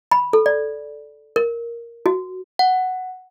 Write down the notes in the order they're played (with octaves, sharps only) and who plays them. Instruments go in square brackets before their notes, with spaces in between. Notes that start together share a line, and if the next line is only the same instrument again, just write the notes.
[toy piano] B5
A4
D5
A#4
F#4
[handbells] F#5